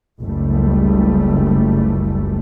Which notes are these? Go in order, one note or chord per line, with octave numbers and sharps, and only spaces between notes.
F#1 C#2 G3 A3